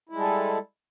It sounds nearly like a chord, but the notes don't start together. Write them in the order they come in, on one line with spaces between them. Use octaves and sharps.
E4 G#3 G3 A4